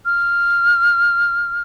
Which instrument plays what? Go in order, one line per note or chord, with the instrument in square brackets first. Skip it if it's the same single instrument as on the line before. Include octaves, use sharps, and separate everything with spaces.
[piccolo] F6